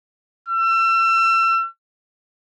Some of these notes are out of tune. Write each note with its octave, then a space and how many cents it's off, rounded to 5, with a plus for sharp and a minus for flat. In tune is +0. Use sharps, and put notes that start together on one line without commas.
E6 +35